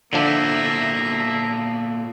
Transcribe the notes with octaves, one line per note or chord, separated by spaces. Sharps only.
A#2 D3 F3 A3 A#3 D4 E5